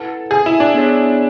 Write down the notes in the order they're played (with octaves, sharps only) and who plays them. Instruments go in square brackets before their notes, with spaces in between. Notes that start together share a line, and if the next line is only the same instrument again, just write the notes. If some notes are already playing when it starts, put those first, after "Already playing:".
Already playing: [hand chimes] E4 B4 F#5 [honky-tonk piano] A4
[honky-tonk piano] G#4
E4
D4
[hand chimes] B3 D4 G#4 C#5